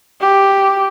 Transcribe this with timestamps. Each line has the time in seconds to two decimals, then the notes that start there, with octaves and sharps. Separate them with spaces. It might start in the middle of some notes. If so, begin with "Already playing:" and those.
0.21 G4